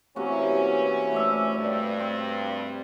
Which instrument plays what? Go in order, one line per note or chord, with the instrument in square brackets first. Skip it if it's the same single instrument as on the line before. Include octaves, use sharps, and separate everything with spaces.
[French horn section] E2 E3 C#4 [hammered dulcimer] C3 A#3 F#4
[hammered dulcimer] A3 D5 E5
[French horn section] G2
[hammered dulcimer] C4